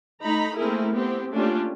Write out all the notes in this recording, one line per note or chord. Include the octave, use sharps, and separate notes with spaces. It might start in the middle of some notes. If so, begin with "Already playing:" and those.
A3 D#4 A#5 B5
A3 A#3 C4 E4 G#4 A#4
B3 C4 G4
A3 A#3 C#4 D4 F4 G4